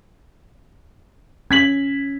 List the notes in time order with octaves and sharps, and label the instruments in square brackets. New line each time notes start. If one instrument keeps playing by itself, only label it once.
[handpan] C#4 [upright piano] G#6 B6 F#7